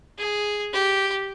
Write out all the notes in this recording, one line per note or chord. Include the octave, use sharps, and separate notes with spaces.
G#4
G4